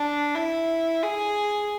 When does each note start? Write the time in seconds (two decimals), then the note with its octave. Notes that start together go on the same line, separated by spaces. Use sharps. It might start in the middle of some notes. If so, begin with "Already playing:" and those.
Already playing: D4
0.35 E4
1.03 G#4